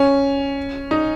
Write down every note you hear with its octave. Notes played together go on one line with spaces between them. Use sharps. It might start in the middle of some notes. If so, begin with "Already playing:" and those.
Already playing: C#4
D#4